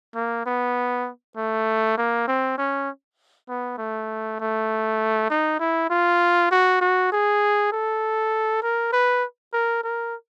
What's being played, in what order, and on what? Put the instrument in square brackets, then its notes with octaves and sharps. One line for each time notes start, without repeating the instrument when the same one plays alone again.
[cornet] A#3
B3
A3
A#3
C4
C#4
B3
A3
A3
D#4
E4
F4
F#4
F#4
G#4
A4
A#4
B4
A#4
A#4